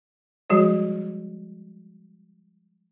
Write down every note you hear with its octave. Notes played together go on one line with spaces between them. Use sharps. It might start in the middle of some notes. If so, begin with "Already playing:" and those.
F3 G3 G#3 F#4 G#4 C#5